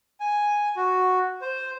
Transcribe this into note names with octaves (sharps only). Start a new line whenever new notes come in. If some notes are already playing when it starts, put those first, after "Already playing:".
G#5
F#4
C5